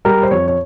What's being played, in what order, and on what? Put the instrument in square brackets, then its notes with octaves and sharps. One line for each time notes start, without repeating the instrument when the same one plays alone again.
[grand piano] G3 A#4
C5
F2 C#5
C#5